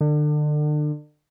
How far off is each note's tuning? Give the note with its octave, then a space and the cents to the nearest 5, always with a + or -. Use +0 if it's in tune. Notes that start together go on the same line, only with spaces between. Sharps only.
D3 +35